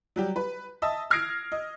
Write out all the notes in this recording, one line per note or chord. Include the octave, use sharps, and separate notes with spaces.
F#3 G3 G4
B4
D#5 E5 A5 D#6 E6
D#6 F6 G#6 A#6 C7 D7
D#5